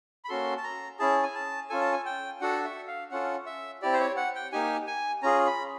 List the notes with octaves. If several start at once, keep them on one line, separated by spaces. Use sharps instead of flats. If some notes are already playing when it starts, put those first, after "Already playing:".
B5
A#3 C#4 F#4 A4 C6
A5
A#5
C#4 E4 G#4 A5
G#5
A5
C#4 F4 A4 G#5
A5
G#5
G5
D4 F#4 A4 F#5
E5
F5
C#4 F4 A4 F#5
E5
C4 E4 G4 D5
C5
C#5
F#5
G5
A#3 D#4 G4 G#5
G#5
C#4 F4 G#4 A#5
B5